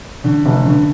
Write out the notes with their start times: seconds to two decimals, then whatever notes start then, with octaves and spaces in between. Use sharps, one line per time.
0.24 D3
0.45 F1
0.65 D3